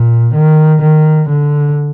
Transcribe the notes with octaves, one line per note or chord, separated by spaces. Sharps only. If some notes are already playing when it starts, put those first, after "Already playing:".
Already playing: A#2
D#3
D#3
D3